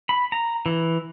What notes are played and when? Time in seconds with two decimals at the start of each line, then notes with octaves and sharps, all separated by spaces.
0.09 B5
0.32 A#5
0.66 E3